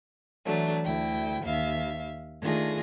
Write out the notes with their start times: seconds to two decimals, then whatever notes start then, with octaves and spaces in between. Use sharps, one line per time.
0.45 E3 F#3 A3 D4
0.83 D2 E4 G5
1.43 D#2 E5 F5
2.41 D#3 A3 D4 F4 G#4 A#6